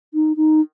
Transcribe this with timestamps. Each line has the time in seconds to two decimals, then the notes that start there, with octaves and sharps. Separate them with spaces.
0.14 D#4
0.37 D#4